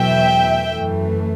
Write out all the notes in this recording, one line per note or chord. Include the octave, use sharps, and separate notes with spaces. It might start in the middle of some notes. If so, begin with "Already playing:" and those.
Already playing: E2 B2 F#3 A3 E5 G5
F#2 E3 A3